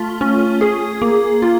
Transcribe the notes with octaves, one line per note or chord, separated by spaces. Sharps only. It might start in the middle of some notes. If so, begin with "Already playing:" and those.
Already playing: A3 F4
C#4
G#4
A#3
F4